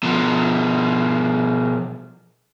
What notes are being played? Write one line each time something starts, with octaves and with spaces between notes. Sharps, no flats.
B2 F3